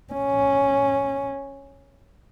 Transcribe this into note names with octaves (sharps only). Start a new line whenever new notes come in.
C#4